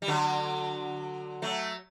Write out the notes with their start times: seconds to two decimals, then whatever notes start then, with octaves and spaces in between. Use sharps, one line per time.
0.02 G3
0.08 D3 F#3
1.42 F#3 A3